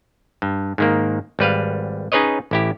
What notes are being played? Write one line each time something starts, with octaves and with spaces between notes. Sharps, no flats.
G2
G#2 D#3 A#3
G#1 G3 B4 F5
C#4 D#4 G#4 B4 C#5 D#5
A1 E4 G4